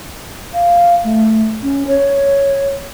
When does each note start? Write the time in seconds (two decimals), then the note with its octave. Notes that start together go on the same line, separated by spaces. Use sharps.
0.53 F5
1.04 A3
1.63 C#4
1.87 C#5